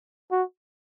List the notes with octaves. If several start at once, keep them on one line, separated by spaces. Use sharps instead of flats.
F#4